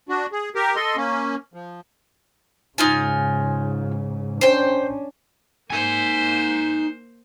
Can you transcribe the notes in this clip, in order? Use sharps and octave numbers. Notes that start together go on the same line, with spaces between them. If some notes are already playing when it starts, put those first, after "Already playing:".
D4 F#4
G#4
G4 A#4
A4 D#5 C6
A#3 C#4
F3
G#2 C#3 D#4 F4 G#5
C#4 D4 C5 G5
A#3 D#4 C5 G#5